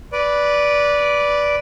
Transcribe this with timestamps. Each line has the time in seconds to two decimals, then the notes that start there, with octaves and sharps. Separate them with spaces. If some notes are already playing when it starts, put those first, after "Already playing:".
0.12 B4 D5